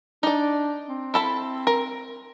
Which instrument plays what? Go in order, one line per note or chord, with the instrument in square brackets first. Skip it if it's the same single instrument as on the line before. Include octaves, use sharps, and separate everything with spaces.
[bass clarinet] D4 [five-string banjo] D#4 D5
[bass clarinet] C4
[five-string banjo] E4 A4 B5
A#4